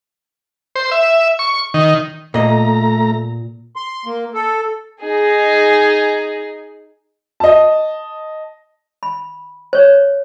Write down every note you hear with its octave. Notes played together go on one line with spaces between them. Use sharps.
C5
E5
C#6
D#3
A#2 A3 D#5 A#5
C6
A#3
A4
D#4 G#4
D#5 A5
B5
C5 C#5